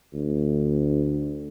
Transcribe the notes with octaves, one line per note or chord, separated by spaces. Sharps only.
D2